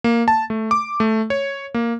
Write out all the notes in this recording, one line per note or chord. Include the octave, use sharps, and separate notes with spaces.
A#3
A5
A3
D6
A3
C#5
A#3